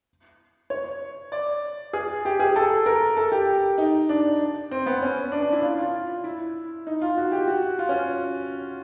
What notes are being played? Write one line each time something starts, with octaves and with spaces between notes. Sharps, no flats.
C#5
D5
G#4
G4
G#4
A4
A#4
A4
G4
D#4
D4
C4
B3
C#4
D4
D4
E4
F4
F4
E4
D#4
F4
F#4
G4
F#4
F4
C#4